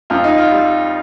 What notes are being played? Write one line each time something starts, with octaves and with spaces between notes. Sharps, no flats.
F2 F4
D#4
F4
G3